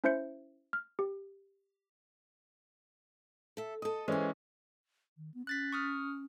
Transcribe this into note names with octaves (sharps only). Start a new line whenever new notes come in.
C#4 E4 C5 E5 G6 C#7
F6
G4
A4 E5
A4 D#5 D#6
E3 G#3 C#4 C5 G#5
D#3
B3
C#4 F#6 A6 B6
C#6 D#6 F6